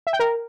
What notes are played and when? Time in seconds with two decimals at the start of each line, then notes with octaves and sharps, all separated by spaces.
0.07 E5
0.13 G5
0.19 A#4